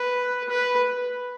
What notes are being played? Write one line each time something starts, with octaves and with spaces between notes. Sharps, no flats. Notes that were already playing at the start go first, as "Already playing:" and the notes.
Already playing: B4
B4